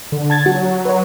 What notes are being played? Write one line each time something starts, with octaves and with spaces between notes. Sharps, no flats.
D3
A5 G#6 A6
F#3 F#4
B4 C#5